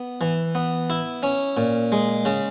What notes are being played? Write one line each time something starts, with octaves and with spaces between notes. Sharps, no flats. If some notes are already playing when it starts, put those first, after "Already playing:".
Already playing: B3
E3
B3
E4
C#4
A#2
G#3
C#3